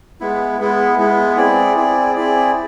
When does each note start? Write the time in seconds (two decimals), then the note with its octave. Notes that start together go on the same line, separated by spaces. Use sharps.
0.20 G#3 B3 E4
0.60 G#3 B3 E4
0.98 G#3 B3 E4
1.37 C4 E4 G#4 D5
1.77 C4 E4 G#4 D5
2.15 C4 E4 G#4 D5